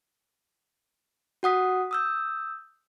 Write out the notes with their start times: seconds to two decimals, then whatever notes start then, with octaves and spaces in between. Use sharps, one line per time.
1.43 F#4 F#5 D#6 B6
1.91 D#6 E6 G6